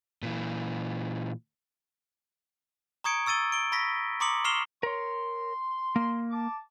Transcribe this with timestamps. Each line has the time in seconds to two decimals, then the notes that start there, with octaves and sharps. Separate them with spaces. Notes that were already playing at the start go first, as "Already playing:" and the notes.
0.23 A#2 E3
3.04 A#5 C#6 D#6 G#6 C#7 D7
3.26 C#6 E6 A6 D#7 G7
3.52 D7 G7
3.72 B5 C#6 E6 A#6 B6
4.20 A#5 C6 D6 D#6 C#7 F#7
4.45 C#6 F6 C7 E7 F7 G7
4.83 A#4 C#5 C6
5.96 A#3
6.31 A5 D6